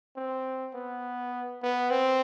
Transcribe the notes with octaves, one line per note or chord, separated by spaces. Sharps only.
C4
B3
B3
C4